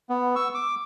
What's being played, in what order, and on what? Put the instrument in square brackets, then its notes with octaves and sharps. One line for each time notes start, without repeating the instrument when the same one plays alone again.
[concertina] B3
C#6 E6
D6